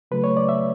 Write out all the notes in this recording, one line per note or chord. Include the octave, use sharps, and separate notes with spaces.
C#3 F#3 A3 B4
C#5
D5
E5